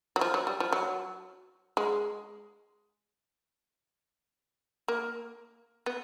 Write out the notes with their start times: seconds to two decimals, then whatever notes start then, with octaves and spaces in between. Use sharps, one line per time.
0.16 F#3
0.21 F3
0.34 F#3
0.47 G3
0.60 F3
0.73 F#3
1.77 G#3
4.88 A#3
5.86 B3